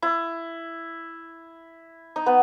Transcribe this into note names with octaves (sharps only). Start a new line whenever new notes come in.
E4
D#4
B3